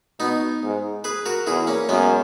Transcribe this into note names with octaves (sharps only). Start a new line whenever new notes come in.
B2 B3 D#4
G#2
G#4 B4
F#4 A#4
E2 E4 G#4
A#3 C#4
F#2 G#3 B3